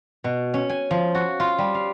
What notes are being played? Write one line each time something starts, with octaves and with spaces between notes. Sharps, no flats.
B2
C#4
G#5
F3
F#4
F4
G3
F5